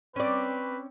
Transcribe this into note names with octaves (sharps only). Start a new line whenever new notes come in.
C4 C#4 B4 D5